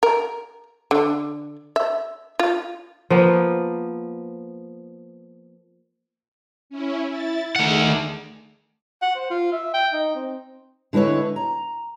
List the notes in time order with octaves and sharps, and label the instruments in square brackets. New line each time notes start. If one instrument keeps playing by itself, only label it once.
[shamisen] A#4
D3
E5
F4
[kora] F3 A#3 B3
[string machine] C#4 E4
E4 A6
[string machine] D#3 G#4 [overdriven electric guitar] A3 F#5
[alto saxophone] F#5
C5
F4
E5
G5
D#4
C4
[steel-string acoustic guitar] D3 G#3 E4 B4 C#5
A#5